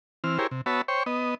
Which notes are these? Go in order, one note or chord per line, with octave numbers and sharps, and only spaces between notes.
E3 C4 F6
E4 G4 G#4 A#4 C5 C#5
C3
B3 F#4 C#5 E5 A5 B5
C5 C#5 G5 C#6
B3 D#5